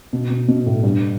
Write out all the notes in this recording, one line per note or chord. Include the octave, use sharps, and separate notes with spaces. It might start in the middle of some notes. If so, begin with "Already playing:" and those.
B2
B2
B2
A2
G2